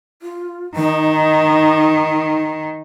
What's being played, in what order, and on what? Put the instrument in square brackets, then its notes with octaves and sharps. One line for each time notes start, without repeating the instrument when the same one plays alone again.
[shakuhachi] F4
[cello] D#3 [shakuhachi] D#4